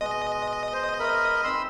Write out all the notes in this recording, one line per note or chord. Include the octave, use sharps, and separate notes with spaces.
B2 G#3 D#5
C5
A#4 C5 E5 B5
C4 D#4 B5 C6 E6